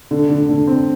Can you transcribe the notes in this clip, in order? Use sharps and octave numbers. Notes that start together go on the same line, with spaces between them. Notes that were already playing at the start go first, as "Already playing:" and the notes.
D3
D3
D3
C4